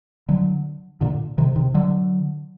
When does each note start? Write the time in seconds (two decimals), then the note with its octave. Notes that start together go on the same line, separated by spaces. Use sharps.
0.29 D3 F#3
1.01 A#2 D3
1.38 C3 D#3
1.56 C3 D#3
1.74 D3 F#3